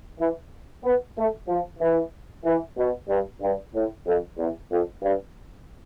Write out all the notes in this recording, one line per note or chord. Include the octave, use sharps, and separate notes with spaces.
E3
B3
A3
F3
E3
E3
B2
G2
G2
A2
F2
E2
F2
G2